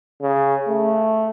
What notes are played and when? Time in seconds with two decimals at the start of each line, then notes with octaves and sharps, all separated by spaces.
0.22 C#3
0.68 A3